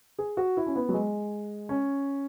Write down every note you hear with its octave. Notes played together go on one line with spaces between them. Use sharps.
G#4
F#4
E4
C#4
B3
F#3
G#3
C#4